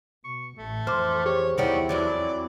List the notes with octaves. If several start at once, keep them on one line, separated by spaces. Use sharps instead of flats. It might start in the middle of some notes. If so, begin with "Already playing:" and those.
B2 C#6
A1 A3
F2 E3 C4 D6 F6
G4 G#4 C5 C#5
E2 D#3 G3 E4 C#5 F#5
F2 E3 F#3 D5